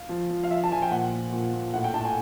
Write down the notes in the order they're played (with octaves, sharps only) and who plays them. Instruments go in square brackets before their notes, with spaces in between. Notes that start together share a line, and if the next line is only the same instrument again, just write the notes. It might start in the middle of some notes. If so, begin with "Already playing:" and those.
Already playing: [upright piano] F5
F3
F3
F5
F3 E5
A5
F3 G#5
G5
A#2 F#5
A#2
A#2
A#2
A2 F#5
G5
A2 A5
G#5